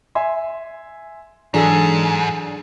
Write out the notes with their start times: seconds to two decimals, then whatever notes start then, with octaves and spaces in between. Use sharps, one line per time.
0.15 E5 G#5 C6
1.54 G#2 E3 F#3 D4 G#4 A4 D5